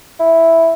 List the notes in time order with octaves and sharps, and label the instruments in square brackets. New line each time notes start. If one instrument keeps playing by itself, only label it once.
[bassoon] E4